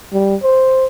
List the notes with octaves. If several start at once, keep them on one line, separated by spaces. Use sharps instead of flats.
G3
C5